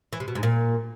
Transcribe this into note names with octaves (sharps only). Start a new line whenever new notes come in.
E3
C3
B2
G#2
A#2